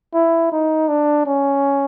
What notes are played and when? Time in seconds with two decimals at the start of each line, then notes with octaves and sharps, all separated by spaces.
0.14 E4
0.52 D#4
0.88 D4
1.26 C#4